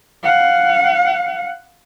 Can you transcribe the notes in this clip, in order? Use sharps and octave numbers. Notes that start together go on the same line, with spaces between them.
F5 F#5